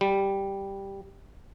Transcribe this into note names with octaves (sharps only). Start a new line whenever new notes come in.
G3